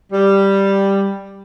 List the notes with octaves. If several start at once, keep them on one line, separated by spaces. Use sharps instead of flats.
G3